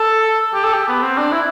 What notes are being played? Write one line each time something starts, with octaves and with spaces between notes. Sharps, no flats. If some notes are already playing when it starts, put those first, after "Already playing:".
Already playing: A4
G4
A4
G4
B3
C4
D4
E4